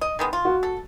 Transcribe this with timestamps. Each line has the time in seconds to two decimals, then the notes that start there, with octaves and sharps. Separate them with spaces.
0.01 D#5
0.19 D#3 G#3 B3
0.33 F4
0.45 F#4
0.63 A4